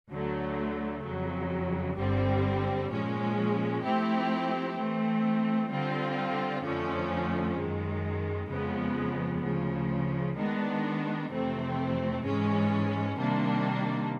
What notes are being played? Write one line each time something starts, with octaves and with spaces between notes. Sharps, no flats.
D2 D3 F#3 A3
F2 C#3 F#3
G1 G2 D3 G3 C4
A#2 F3 G#3 C#4
F3 A3 C4 E4 G4
E3 A3 C4
D3 G3 C4 F4
F2 D3 F3 A3 C#4
F#2 D#3 G#3
F2 C#3 F3 G#3 B3
D2 C#3 F3
D#3 G#3 B3 D4
F2 C3 E3 A3 C4
G#2 E3 G#3 C#4
C3 D#3 G3 A#3 D4